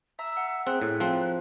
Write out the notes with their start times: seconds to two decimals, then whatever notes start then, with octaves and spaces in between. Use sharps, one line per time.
0.19 E5 A#5 E6
0.37 F#5
0.67 C4 G#4 E5 F#6
0.82 A2
1.00 F3 C4 A#5